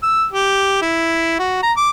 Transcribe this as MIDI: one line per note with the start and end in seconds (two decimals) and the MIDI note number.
0.03 0.25 88
0.33 0.79 67
0.82 1.36 64
1.39 1.63 66
1.63 1.72 82
1.77 1.90 86